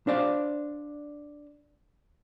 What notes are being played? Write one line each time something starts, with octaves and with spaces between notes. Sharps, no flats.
D4 C5 D5 F5